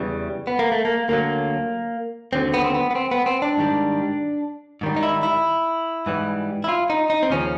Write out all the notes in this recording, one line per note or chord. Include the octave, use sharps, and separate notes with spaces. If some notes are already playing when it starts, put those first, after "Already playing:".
Already playing: E2 C#3 E3 G3
B3
A#3
A3
A#3
D2 D3 F#3 A#3
D#2 D3 F#3 C4
B3
C4
B3
B3
C4
B3
C4
D4
G#2 D#3 G3
G#2 D#3 G3
D#4
E4
E4
G#2 E3 G3
E4
F4
D#4
D#4
C4
D#2 C#3 F3 C#4